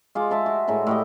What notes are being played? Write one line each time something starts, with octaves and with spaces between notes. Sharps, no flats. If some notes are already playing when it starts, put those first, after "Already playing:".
G#3 F4 D6
G#3 E5 A5 C6
F#4
A2 G#3 A#4 F#5
A2 G4 D#5